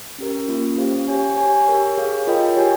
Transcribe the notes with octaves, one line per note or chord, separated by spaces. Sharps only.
C#4 G4 A#4
A#3 C#4 F4
C#4 G4 C5 F5
G4 C#5 G#5
G4 C#5 G#5
G4 A#4 C#5
G#4 C#5 F5
F4 A#4 D#5 G5
G4 C#5 G#5